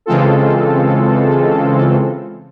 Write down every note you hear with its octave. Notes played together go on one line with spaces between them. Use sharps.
C#3 E3 G#3 C4 F4 A4